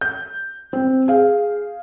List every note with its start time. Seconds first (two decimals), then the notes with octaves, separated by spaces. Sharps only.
0.01 G6
0.73 C4
1.08 G#4 F5